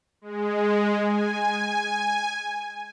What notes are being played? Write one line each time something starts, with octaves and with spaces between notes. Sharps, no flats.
G#3
G#5